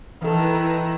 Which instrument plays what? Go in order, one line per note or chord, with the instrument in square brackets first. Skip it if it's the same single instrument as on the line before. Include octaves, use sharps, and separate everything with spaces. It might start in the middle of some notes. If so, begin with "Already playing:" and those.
[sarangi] D#3 [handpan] E3 A4 [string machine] E4 B4 A#5